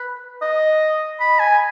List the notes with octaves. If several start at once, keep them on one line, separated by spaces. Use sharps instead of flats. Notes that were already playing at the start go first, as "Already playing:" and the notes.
Already playing: B4
D#5
B5
G#5